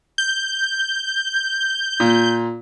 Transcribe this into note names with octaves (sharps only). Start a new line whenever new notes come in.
G6
A#2